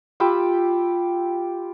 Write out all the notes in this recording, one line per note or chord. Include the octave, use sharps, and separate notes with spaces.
F4 G4 B5 E6